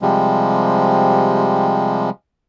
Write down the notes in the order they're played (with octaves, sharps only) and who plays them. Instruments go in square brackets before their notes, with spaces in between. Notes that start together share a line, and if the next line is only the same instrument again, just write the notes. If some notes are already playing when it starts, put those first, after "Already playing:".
[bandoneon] C3 F3 G3 G#3